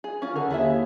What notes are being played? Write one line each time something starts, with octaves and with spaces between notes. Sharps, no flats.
G#4
C#4 F4
D3 G#4 A#4
D#2 E4 G#4 E5